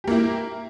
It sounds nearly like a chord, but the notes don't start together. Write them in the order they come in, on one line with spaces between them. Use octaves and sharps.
G4 A#3 E4